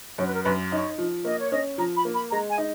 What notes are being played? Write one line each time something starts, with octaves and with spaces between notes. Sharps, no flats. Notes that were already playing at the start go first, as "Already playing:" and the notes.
F#2 C#5
B4
A#4
F#2 B4
D#4 C#5
F3
A#3 D#5
C#5
C#4 D#5
F3 A#5
B5
A#3
B5
G#3 A#5
G#5
D#4